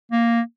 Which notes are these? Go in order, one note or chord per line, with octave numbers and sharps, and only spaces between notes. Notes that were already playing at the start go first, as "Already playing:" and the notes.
A#3